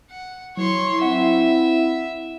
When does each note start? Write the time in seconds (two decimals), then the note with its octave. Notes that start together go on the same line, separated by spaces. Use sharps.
0.10 F#5
0.57 F#3 E4 C#5 C6
1.02 C4 E4 E5 F#5